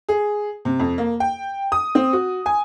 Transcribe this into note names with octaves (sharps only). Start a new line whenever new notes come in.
G#4
C3
F2
A#3
G5
D#6
C4
F#4
G#5